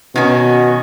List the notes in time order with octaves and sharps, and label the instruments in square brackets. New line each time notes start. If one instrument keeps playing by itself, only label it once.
[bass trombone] B2 [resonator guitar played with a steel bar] D#3 C#4 [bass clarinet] F#4